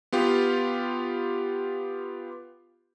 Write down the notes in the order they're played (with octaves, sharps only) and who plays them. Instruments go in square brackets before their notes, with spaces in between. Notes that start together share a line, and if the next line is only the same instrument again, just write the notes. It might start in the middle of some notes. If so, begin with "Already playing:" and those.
[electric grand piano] B3 F4 G4